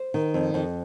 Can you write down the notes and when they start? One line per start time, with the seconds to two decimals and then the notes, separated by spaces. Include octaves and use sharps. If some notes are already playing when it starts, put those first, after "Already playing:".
Already playing: C5
0.14 D#3
0.34 F2
0.54 F2